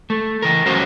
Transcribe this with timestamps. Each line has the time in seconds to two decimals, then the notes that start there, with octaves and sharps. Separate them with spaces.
0.10 A3
0.42 E3 A#4
0.66 F#3 G3 C#4 F#4 A#4 C5